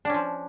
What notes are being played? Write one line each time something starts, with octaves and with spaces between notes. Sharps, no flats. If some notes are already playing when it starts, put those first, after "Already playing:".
F3 C#4 D4